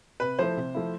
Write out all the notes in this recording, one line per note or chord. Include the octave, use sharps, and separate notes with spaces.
C3 B4
F3 A3 E4 C5
C3
F3 A3 E4